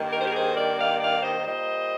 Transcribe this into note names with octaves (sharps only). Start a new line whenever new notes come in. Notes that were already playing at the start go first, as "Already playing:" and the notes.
Already playing: G2 D#3 A#3
A#4
C5
G4 A#4
G#4 C5
A#4 D5
D5 F5
D5 F5
C5 D#5
A#2 G3 A#3 C5 D#5